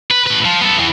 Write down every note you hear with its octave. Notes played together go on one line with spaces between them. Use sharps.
B4
A2 B4
F3
B3 A4
E2 E3